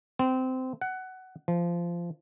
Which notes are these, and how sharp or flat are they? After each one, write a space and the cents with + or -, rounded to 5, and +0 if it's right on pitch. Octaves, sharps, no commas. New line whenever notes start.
C4 -20
F#5 +15
F3 -20